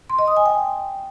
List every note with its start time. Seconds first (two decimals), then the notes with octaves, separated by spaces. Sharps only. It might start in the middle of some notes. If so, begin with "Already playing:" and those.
0.10 C6
0.19 D#5
0.28 D#6
0.37 G#5
0.46 G5